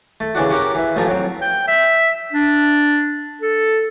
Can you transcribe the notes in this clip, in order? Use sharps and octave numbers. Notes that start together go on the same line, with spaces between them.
A3
C#3 E3 D4 F#4
C#4 F#4 G4 A#4
E3 E5
A1 F3 A3 G#5 A#5
F#3 C4
G5
E5
D4
A4